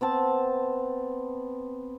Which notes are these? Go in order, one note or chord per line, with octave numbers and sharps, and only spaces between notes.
B3 C4 A5